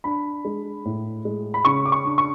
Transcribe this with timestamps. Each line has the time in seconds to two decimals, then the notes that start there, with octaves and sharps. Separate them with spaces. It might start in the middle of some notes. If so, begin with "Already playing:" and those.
0.04 D4 B5
0.45 G#3
0.85 A2
1.25 G#3
1.54 B5
1.65 C#3 C#6
1.86 D6
1.92 C#6
2.05 D4
2.18 C#6